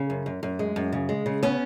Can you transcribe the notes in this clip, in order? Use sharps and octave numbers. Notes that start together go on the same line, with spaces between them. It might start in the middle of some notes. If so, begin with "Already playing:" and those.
Already playing: C#3
F#2
F#2
F#2
G#3
F#2
C#3
G#3
C#3
B3 C#4